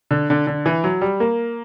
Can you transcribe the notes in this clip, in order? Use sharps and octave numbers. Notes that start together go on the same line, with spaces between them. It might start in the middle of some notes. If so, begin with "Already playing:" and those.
D3
D3
D3
E3
F#3
G3
A#3